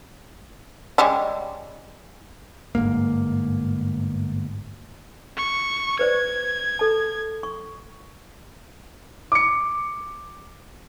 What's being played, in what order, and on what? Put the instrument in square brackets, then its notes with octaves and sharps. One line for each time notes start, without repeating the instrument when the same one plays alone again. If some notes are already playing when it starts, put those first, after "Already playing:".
[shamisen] G3 G#3 C#4
[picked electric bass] G1 G#2 A#3
[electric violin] C#6
[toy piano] B4 C5 D5 [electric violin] G#6
[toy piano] A4 A5
C#6
[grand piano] D6 C#7